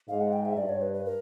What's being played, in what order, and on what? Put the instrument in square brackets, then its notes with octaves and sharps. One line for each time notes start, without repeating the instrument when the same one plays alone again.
[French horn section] G#2 [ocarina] F5
[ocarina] F#5
G5
E5
[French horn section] G2 [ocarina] D5
[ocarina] C#5
B4
B4
A#4